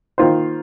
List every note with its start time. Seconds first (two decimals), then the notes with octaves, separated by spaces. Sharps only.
0.18 D#3 A#3 F4 C5